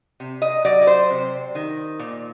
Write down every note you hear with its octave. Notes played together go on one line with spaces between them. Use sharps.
C3
D#5
F#3 D5
D5
C5
C3
D#3
A#2